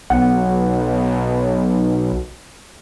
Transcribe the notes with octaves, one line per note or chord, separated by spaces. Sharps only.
B1 F#5